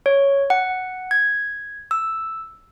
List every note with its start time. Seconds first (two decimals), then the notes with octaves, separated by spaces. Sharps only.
0.06 C#5
0.50 F#5
1.11 G#6
1.91 E6